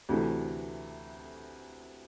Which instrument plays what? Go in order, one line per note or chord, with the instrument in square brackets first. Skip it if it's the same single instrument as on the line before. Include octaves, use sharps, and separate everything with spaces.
[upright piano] D2 C3 E3 A3